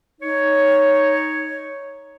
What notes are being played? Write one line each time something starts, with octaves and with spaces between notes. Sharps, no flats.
D#4 C#5